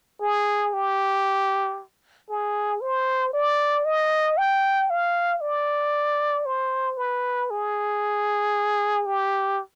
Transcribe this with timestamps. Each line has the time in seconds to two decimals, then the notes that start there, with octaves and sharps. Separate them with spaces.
0.21 G#4
0.73 G4
2.30 G#4
2.81 C5
3.33 D5
3.85 D#5
4.38 G5
4.90 F5
5.41 D5
6.46 C5
6.97 B4
7.51 G#4
9.06 G4